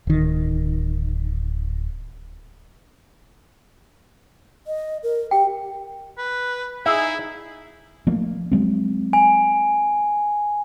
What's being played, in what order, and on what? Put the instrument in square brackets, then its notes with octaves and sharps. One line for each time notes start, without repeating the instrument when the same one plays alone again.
[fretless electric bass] D1 D#3
[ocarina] D#5
A#4
[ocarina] G4 [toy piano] G5
[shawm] B4
[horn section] D#4 G#4 [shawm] E4 [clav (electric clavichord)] E5
[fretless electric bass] F3 A3 A#3
F#3 G#3 C4
[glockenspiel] G#5